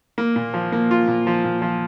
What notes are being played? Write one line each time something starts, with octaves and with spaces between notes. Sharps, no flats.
A#3
A#2
F3
A#3
F4
A#2
F3
A#2
F3